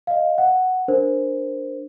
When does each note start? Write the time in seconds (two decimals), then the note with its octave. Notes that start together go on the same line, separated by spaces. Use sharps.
0.07 D#5 F5
0.38 F#5
0.88 D4 A#4 C5